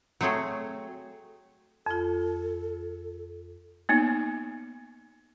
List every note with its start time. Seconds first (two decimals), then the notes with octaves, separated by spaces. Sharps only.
0.21 F#3 A3 C4 G#4 C#5
1.86 F2 F4 A4
3.89 A#3 B3 D#4